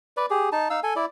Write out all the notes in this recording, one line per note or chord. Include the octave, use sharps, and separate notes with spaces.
B4 D5
G4 G#4
D#4 A5
D#4 F5 E6
A4 G#5
E4 D5